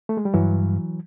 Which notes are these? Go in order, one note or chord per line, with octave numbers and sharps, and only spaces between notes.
A3
G#3
G3
G2 E3 F#3